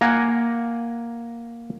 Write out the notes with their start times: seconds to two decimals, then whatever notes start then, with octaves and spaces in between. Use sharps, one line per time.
0.01 A#3 A#4 F#5 G#5